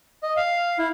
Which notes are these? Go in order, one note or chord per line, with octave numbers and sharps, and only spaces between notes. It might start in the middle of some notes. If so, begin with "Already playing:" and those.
D#5
F5
E4